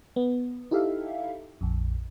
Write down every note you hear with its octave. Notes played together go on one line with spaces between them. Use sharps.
B3
D#4 E4 G4 A4 E5 F5
A#1 F2